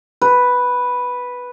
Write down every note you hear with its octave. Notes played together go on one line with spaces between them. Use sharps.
B4